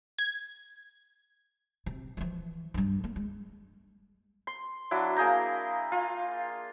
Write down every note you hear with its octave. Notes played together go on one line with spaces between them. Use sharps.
G#6
C3
E3 F3
G2 G3
A#3
G#3
C6
F#3 D4 E4
A#3 G#4 G5 A#5
F4